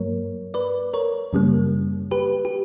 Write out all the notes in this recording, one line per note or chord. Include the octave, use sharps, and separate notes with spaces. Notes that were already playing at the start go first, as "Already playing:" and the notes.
Already playing: G2 F#3 A#3 A#4 C#5
B4 D5
A#4 C#5
F#2 C#3 G3 A#3
G4 B4
G4